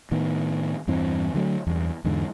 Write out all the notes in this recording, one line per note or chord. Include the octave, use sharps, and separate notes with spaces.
A2 D#3 B3
E2 G2 E3 C4
D3 F#3 A3
E2 G2
E2 G#2 D3